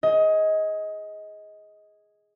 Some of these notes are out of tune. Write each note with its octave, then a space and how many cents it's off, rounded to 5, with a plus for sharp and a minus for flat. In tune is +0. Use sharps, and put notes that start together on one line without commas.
G#4 +0 D#5 +20